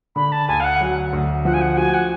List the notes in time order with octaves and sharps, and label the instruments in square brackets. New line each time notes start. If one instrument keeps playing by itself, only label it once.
[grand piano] D3 [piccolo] B5
[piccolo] A5
[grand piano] D2 [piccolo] G#5
[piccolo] F5
F#5
[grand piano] F#3
D2
[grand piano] F3 [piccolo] F#5
[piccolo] G#5
F#5
[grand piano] F#4 [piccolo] G#5
[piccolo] F#5